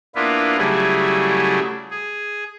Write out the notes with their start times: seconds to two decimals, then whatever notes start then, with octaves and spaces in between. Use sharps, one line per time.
0.15 A#3 B3 D4 E4 F4 B4
0.58 C#3 F#3 G3 A3 E4 G#4
1.91 G#4